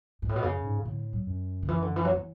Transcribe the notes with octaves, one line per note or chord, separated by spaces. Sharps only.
G#2
A2
B2
F#2 C#3
G#2
A2 D3
F#3
F#2
D3
E3
D3
E3
F#3
E3